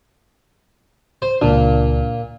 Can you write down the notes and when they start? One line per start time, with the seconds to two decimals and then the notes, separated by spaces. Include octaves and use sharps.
1.22 C5
1.41 C#2 A#2 D4